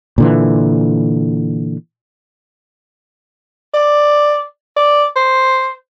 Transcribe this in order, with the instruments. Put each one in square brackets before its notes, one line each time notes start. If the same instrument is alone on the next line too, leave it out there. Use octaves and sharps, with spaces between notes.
[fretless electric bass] A#2 D3 E3
[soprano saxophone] D5
D5
C5